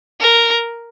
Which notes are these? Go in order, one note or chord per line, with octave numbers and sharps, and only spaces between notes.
A#4